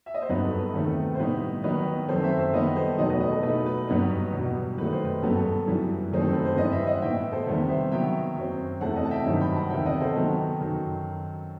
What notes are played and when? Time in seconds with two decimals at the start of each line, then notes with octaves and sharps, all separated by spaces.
0.06 E5
0.14 D#5
0.22 C5
0.29 G2 F#3 B3 D#4 B4
0.44 A4
0.59 B4
0.74 E2 C3 D#3 A3
1.14 C5
1.19 A2 G3 B3 D#4 B4
1.64 D#3 F#3 B3 D#4 B4 D#5
2.08 F#2 D#3 F#3 C4 A4 C5
2.23 C5 E5
2.39 C5 E5
2.53 D#3 G3 B3 B4 D#5
2.76 A4 C5
2.98 E2 B2 F#3 A3 D#4 B4 D#5
3.09 B4 D#5
3.20 B4 D#5
3.32 A4
3.43 B2 A3 D#4 B4
3.66 B4
3.87 G2 F#3 B3 D#4 B4
4.33 E2 B2 G3
4.78 F#2 D#3 A3 D#4 B4
4.92 C5
5.05 B4
5.22 G2 F#3 B3 A4
5.37 A4
5.67 F#2 E3 G3
6.12 F#2 D#3 A3 C4 D#4
6.21 A4
6.33 B4
6.45 C5
6.57 G2 E3 G3 B4 D#5
6.71 C5 E5
6.87 D#5 F#5
7.02 A2 E3 B3 E5 G5
7.32 A4 C5
7.46 E2 C3 D#3 G3 B3
7.69 C5 E5
7.92 D#3 F#3 B3 E5 G5
8.36 F#2 F#3 C4
8.81 E2 C3 E3 A3 F#5 A5
8.96 D#5 F#5
9.05 A5
9.11 E5 G5
9.26 G2 D#3 F#3 C4 D#4
9.41 G5 B5
9.55 F#5 A5
9.70 E2 C3 D#3 E5 G5
9.86 D#5 F#5
10.01 A4 C5
10.16 D#3 F#3 B3
10.61 F#2 D#3 F#3